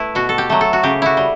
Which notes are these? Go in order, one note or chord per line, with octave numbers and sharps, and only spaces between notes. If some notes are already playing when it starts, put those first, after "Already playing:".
Already playing: A3 E4 B4
B2 F#4
A4
G4
F#3 A3
A4
F#4
C#3 G4
E4 F#4
G3